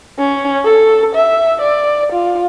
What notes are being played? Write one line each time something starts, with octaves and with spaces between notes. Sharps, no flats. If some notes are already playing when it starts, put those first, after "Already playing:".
C#4
A4
E5
D5
F4